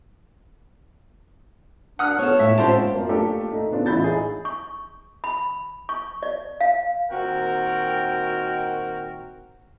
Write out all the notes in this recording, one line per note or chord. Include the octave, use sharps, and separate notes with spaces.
D4 F#5 D#6 F6
B3 F4 A4 C#5
A2 E5
G#2 C#3 C4 F4 G4 C5 A5
F#2 A#3 F4
A3 A#3 D4 F4 G4 A4
A3 D#4
C#3 B3 C4 D4 F4
A1 E4 F4 B5 G6 A6
D#4 G#4
C#6
B5
C#6
D5
F5
A#2 D#3 C4 F#4 A#4 G5